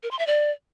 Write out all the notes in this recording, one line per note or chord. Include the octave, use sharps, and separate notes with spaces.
A#4
C6
E5
D5